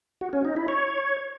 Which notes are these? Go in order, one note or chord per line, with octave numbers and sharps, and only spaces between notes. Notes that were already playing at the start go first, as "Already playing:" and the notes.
F#4
C#4
D#4
E4
C#5